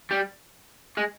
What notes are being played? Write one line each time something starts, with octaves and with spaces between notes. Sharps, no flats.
G3
G#3